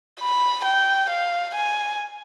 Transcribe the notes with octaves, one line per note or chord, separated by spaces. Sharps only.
B5
G5
F5
G#5